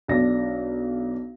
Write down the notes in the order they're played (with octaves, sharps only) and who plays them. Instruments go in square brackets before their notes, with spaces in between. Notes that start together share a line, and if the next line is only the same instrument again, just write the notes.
[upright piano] B1 D4 A#6